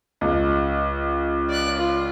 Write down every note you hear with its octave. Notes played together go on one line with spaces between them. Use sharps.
C#2 D#5
D5 F#6
F4